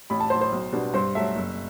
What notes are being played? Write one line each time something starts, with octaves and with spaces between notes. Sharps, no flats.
A1 B5
A5
A2 F#3 C5
C5
B1
B2 G3 B3 D4
G2 C5
F#3 A3 E5
F#1